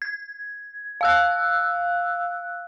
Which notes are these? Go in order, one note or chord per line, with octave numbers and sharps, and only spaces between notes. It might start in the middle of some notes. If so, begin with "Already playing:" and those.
G#6
F5 E6 F#6